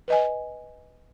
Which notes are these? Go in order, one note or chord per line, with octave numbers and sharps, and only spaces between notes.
B4 D#5 G#5